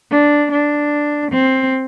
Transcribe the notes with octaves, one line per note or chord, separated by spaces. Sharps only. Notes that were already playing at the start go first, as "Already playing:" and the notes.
D4
D4
C4